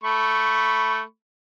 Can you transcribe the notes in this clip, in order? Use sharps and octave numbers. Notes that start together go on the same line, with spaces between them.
A3 B5 C#6